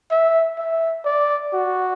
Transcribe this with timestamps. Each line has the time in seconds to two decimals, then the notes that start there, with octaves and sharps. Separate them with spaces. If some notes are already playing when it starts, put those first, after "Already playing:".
0.11 E5
0.58 E5
1.05 D5
1.53 F#4